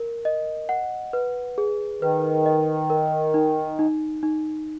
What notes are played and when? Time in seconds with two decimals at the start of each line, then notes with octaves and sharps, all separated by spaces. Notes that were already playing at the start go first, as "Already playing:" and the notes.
Already playing: A#4
0.25 D#5
0.69 F#5
1.13 B4
1.58 G#4
2.01 D#3 B4
2.46 D#5
2.90 A#4
3.34 D#4
3.79 D#4
4.23 D#4